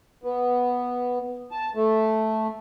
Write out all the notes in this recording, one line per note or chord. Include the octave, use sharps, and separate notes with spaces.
B3
A5
A3